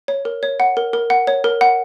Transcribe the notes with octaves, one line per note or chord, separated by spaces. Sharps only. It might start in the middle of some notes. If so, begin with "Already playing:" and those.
C#5
A#4
C#5
F#5
A#4
A#4
F#5
C#5
A#4
F#5